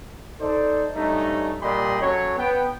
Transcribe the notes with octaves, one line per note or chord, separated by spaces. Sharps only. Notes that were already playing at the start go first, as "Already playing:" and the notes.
D#4 A4 C5 D5
G2 G3 A3 C#4 D#4
A#2 G3 G4 D#5 B5 C6
F#3 C#4 A4 C#5
B3 G5